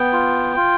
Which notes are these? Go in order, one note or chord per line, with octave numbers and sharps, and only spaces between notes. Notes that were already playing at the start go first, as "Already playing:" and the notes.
Already playing: B3 G5
F4
F4